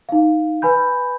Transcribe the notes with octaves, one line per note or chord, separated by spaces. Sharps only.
D#4 F5
B4 G#5 B5 G6